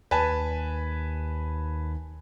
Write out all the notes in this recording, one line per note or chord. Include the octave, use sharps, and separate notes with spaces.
D#2 B4 G#5 A5